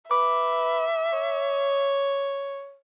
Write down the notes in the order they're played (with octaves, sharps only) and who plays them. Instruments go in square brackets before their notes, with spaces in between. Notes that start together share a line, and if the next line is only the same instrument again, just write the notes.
[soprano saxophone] B4 [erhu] E5 [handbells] D6
[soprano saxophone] C#5